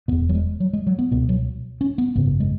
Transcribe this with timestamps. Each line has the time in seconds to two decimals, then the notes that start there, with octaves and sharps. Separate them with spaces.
0.08 B2 B3
0.11 E1 E2
0.29 F#3
0.35 G#3
0.60 F#3
0.73 G#3
0.87 F#3
0.99 B3
1.11 C#2 B2 B3
1.29 F#3
1.81 C#4
1.98 B3
2.15 G#1 F#2 C#3 B3
2.40 G#3